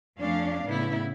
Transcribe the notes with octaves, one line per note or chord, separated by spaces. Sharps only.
F2 A3 C#4 D4 F5
A2 C#3 B3 E4